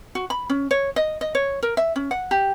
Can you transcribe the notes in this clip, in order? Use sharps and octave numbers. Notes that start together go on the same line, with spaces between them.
F#4
B5
C#4
C#5
D#5
D#5
C#5
A#4
E5
C#4
F#5
G4